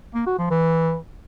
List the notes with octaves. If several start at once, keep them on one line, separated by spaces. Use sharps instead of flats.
A#3
F#4
F3
E3